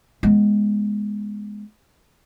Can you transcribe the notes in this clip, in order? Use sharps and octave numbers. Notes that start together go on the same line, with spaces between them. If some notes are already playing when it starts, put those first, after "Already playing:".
G#3 B3